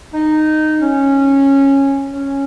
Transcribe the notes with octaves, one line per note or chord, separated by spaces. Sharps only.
D#4
C#4
C#4